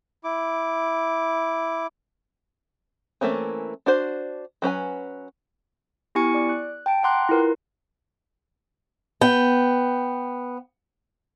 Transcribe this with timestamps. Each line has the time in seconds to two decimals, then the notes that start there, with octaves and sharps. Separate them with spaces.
0.24 E4 D6
3.21 E3 A3 A#3 C4 C#4
3.86 D4 F#4 C5
4.62 F#3 C#4 B4 G#5
6.15 B3 E4 G4 G#5 C#6 C#7
6.34 D5 D6
6.49 F#6
6.86 G5 A5 D7
7.03 F#5 G5 A#5 C6 D6 F#6
7.29 E4 F4 A#4 B4
9.21 B3 G5